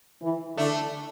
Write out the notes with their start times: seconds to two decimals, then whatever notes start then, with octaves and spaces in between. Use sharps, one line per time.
0.22 E3
0.57 D3 A3 D4